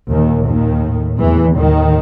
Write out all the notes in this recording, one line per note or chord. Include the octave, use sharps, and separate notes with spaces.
D#2 A#2 D#3
D#2 D#3
A2
E2 E3
D#2 A2 D#3